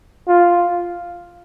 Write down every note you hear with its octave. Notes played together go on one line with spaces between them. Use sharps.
F4